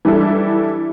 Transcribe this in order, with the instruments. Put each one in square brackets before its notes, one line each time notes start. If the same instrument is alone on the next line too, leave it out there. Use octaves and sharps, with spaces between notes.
[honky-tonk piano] E3 G3 D4 E4 A4